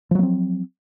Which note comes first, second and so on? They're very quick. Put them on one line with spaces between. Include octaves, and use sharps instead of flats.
F3 F#3 A#3 C4